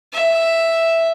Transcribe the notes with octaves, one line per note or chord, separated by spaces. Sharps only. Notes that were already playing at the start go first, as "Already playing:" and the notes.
E5